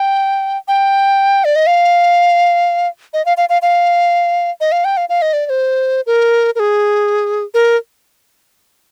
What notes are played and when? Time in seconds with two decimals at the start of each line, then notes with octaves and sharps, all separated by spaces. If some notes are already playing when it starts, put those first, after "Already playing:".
Already playing: G5
0.68 G5
1.45 D5
1.56 D#5
1.67 F5
3.14 D#5
3.26 F5
3.37 F5
3.49 F5
3.62 F5
4.61 D#5
4.72 F5
4.85 G5
4.97 F5
5.09 F5
5.22 D#5
5.33 D5
5.46 D5
5.50 C5
6.06 A#4
6.55 A#4
6.60 G#4
7.54 A#4